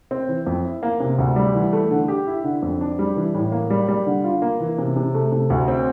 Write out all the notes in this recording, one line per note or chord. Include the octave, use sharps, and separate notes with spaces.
C4
E3
F2
E4
A#3
C3
D2
G3
E3
A3
D3
G4
E4
D3
F2
D4
G3
E3
A2
A#3
G3
G3
D3
F4
A#3
E3
C3
C3
A3
C3
D2
C4